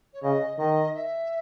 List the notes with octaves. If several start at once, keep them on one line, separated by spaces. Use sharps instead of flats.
C#5
C#3 D#5
D#3 D#5
E5